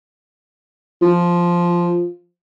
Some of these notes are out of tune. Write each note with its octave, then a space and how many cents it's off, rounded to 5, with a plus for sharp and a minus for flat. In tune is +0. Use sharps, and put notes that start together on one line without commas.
F3 -5